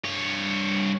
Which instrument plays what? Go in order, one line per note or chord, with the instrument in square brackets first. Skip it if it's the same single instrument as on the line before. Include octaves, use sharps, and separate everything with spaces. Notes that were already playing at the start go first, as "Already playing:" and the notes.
[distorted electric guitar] G2 C#5